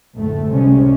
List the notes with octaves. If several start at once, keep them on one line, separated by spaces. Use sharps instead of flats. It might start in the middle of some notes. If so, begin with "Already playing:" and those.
F#1 D2 A2 A3
C#2 C3 G3 G#3 C#4